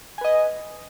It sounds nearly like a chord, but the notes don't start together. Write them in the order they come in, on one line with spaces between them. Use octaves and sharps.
G#5 B4 D#5